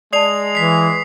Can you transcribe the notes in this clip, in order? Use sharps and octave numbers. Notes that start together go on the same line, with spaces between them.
G#3 D5 A5 D#6 C7 F7
E3 B6 C7